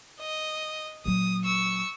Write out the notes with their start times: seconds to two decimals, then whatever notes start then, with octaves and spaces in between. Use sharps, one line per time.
0.20 D#5
1.05 A#2 F#3 D#6
1.45 C#6 E6